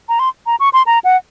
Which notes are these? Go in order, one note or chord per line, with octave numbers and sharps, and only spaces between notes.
A#5
C6
A#5
C#6
C6
A#5
F#5